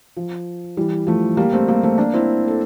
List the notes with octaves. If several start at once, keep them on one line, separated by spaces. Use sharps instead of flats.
F3
E3 G3
F3 A3
G3 A#3
A3 C4
G3 A#3
A3 C4
A#3 D4
C4 E4
A4